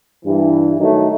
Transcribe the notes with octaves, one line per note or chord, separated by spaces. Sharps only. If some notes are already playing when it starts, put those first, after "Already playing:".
G2 E3
D#3 F#3 A3 D#4